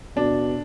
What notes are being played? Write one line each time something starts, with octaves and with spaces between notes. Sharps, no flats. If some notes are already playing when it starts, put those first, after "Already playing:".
B2 D4